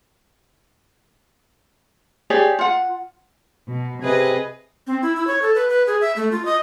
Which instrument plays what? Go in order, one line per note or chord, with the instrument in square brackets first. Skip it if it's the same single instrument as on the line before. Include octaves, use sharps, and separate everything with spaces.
[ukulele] G4 G#4 C#5 D5
F4 F#5
[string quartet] B2
[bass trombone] C3 [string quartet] G#4 B4 D#5
[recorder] C4
E4
E4
C#5
A4
B4
B4
G#4
E5
A3
F4
D#5